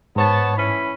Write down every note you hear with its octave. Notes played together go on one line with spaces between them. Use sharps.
G#2 B3 C#5 A5
E3 C#4 B5